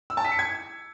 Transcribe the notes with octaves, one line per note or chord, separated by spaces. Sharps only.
E6
A5
B6
C#7
G#6